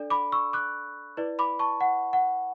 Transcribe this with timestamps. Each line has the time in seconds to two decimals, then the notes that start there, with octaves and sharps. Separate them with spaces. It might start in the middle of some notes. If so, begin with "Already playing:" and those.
Already playing: D4 A4 D5
0.10 B5 D6
0.32 C#6 E6
0.53 D6 F#6
1.17 E4 B4 D5
1.39 B5 D6
1.59 A5 C#6
1.81 F#5
2.13 F#5